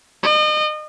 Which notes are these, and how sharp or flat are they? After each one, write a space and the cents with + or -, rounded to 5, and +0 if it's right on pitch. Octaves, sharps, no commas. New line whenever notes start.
D#5 -35